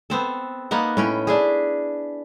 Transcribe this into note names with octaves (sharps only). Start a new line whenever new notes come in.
B3 C4 A4
A#3 B3 D#4 F#5
A2 C#4 G5
D4 E4 G#4